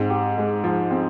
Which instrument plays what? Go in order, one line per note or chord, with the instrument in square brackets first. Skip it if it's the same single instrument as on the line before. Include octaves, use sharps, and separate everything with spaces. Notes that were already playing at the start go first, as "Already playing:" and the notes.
Already playing: [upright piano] G#2 [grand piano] C4
[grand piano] G4
G#3
F3
C4